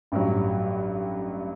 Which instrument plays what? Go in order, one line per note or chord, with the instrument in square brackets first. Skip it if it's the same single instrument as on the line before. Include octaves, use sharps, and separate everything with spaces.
[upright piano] A1 G2 F#3